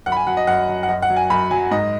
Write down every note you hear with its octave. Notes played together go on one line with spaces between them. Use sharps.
F#2 F#5
B5
G#5
F#3 F#5
D#5
F#2 F#5
F#3
F#5
F#2 D#5
F#5
F#3
G#5
F#2 B5
F#3 G#5
G#2 D#5